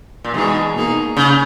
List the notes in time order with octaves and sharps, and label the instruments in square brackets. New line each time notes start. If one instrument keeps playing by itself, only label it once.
[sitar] A#2
[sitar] B2 [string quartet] E3 G#3 D#4 G#4
[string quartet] B2 A#3 D#4 G#4
[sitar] C#3